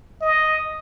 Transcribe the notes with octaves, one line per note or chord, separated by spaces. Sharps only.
D#5